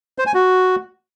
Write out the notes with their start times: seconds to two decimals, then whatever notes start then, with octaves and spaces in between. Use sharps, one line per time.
0.18 C5
0.26 G#5
0.34 F#4